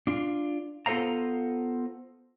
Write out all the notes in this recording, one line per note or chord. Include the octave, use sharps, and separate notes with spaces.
D4 F4
B3 F4 A4 C5 F5 A#5